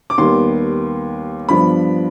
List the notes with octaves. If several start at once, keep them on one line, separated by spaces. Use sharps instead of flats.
D6
D#2 D#3 G3 B3 C6
G2 F3 B3 B5